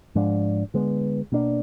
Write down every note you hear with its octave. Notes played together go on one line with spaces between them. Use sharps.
G#2 F3 G#3 D4
D3 G#3 B3
B2 A#3 D4